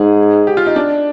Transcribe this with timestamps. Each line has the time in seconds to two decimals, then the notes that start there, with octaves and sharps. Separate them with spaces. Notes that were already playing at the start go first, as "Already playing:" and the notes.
Already playing: G#2 G#4
0.47 G4
0.57 F4
0.67 D#4
0.76 D4